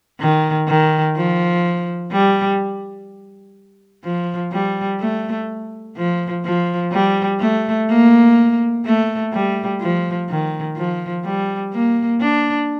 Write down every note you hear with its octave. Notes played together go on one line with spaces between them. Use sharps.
D#3
D#3
F3
G3
F3
G3
A3
F3
F3
G3
A3
A#3
A3
G3
F3
D#3
F3
G3
A#3
D4